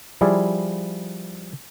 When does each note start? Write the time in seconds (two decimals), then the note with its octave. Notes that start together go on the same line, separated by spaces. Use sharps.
0.21 F3 G3 E4 G#4 D5 F5